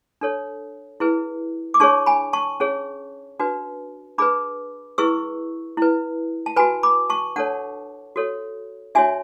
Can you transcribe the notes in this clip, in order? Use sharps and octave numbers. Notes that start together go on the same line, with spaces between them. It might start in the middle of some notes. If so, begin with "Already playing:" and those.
D4 A4 C#5
E4 G#4 B4
D6
D4 G#4 C#5 A5 C#6
G#5 B5
A5 C#6
C#4 G#4 C#5
D4 F#4 B4
D4 G#4 B4 B5 D6
E4 G#4 B4 C#6 E6
E4 B4
A5
F#4 B4 G#5 B5
B5 D6
A5 C#6
D4 A4 C#5 F#5 A5
F#4 A4 C#5
D4 F#4 C#5 E5 G#5